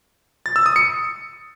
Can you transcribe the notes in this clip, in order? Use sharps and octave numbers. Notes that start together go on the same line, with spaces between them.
A6
E6
D#6
C#7